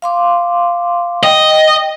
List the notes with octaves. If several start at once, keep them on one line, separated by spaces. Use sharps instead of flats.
F5 C6 D6
D#5 G5